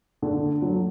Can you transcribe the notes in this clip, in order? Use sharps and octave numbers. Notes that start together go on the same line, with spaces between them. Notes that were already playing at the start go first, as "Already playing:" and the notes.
D3
F#3